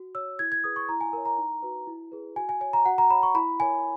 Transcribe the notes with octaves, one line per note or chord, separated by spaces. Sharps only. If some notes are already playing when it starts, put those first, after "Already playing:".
Already playing: F#4
C#5 E6
E4 G#6
G#6
G#4 B4 D#6
C#6
E4 A#5
G#5
A#4 C#5 G#5
A#5
D#4
F#4 B4
E4
G#4 B4
F#4 G#5
G#5
C#5 G#5
A#5
F#4 F#5
A#5
C#5 B5
C#6
E4 B5
A#4 C#5 G#5